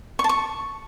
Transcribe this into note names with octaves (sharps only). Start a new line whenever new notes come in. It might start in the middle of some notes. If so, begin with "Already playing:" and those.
C#6
A5
C#6